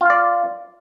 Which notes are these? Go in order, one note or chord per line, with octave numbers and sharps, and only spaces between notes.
F4 D5 F5